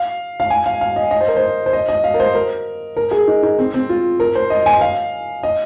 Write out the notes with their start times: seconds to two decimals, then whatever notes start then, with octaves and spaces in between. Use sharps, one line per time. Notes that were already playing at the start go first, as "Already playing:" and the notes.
Already playing: F5
0.40 F5
0.50 G#5
0.66 F5
0.81 F5
0.96 D#5
1.11 D#5
1.21 C5
1.28 A#4
1.37 C5
1.66 C5
1.73 D#5
1.89 D#5
2.04 F5
2.14 A#4
2.20 C5
2.35 A#4
2.97 A#4
3.11 G#4
3.27 D#4
3.43 D#4
3.59 C4
3.74 C4
3.89 F4
4.20 A#4
4.35 C5
4.50 D#5
4.66 G#5
4.77 D#5
4.81 F5
5.43 D#5